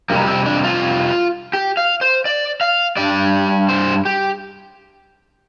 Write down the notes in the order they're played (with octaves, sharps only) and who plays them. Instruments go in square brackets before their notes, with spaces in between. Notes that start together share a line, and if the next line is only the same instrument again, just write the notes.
[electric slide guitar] F2 C3 G3 A#3
C4
D4
F4
G4
F5
C5
D5
F5
G2 G3 D5
C5
G4